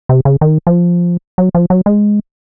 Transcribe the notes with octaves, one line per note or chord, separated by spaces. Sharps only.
C3
C#3
D#3
F3
F#3
F3
F#3
G#3